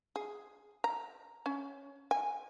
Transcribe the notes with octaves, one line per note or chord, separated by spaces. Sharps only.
G#4
A#5
C#4
G#5